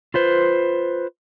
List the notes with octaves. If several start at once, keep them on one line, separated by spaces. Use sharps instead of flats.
F4 B4 C5